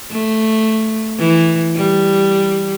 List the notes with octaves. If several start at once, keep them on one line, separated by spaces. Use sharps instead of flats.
A3
E3
G3